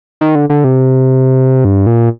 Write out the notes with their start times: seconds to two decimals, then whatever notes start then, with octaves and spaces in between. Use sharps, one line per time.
0.21 D#3
0.35 D3
0.50 D3
0.64 C3
1.65 G2
1.86 A#2